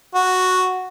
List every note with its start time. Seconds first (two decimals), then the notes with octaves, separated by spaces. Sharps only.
0.14 F#4